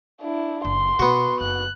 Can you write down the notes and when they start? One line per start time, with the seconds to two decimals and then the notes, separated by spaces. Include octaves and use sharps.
0.22 D4 E4
0.65 F#1 C6
0.99 B2 B3 F#4
1.41 F#1 F#6